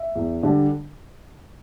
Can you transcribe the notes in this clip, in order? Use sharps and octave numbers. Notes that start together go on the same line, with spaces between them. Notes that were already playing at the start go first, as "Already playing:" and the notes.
Already playing: E5
E2
D3 G3 D4